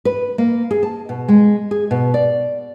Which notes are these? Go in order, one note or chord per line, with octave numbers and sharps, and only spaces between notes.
B4
A#3
G#4
A5
B2
G#3
G#4
B2
D5